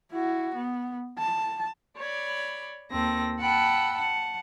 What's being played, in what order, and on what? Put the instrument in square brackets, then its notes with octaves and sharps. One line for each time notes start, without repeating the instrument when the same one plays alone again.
[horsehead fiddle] E4 F#4
B3
A5
[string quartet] C#5 D5 B5
D#2 C4 A4 A#6
F#5 G5 A5 B5 E6 F#6
F#5 A5